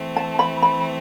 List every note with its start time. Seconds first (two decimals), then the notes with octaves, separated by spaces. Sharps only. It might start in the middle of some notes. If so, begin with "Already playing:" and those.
Already playing: E3 A3 C4
0.16 A5
0.39 B5
0.62 B5